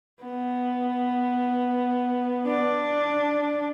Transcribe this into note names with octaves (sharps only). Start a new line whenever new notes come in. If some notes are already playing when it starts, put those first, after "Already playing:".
B3
D4